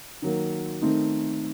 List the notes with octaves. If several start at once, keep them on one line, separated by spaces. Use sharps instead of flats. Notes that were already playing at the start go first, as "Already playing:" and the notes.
D#3 F#3 A#3
D#3 A3 C4 D#4